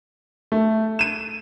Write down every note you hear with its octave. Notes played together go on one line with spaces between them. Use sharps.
A3
D#7 E7